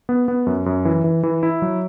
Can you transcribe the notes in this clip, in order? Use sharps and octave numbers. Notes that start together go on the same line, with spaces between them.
B3
B3
F#2
F#2
E3
E3
E3
E4
F#3